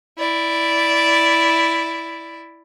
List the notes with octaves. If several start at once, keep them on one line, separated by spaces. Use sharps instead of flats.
E4 D5